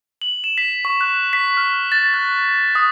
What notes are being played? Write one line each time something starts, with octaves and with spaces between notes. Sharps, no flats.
F#7
E7
B6
C#6
F#6
B6
F6
A6
F#6
D#6